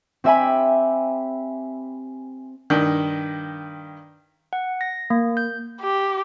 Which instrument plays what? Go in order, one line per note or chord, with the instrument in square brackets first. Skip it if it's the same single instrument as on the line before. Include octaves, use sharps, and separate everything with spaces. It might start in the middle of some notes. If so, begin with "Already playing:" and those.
[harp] C4 G4 E5 G5 G#5 B5
[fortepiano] G2 D#3
[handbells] F#5
A#6
A#3
G6
[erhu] G4